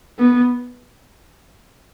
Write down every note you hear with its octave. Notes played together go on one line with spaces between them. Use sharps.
B3